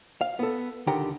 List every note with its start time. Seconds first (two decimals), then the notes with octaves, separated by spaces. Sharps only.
0.21 F5
0.39 B3 A4
0.87 C#2 D3 D#3 G4 F#5 A#5